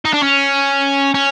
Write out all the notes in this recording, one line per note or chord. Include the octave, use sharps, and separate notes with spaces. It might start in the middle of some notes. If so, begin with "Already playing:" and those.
D#4
D4
C#4
C#4